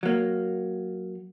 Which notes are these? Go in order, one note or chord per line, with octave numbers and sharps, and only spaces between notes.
F#3 A#3